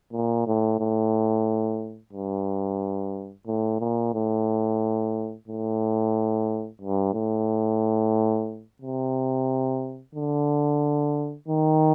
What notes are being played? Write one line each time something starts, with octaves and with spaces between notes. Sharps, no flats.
A#2
A2
A2
G2
A2
A#2
A2
A2
G2
A2
C3
D3
D#3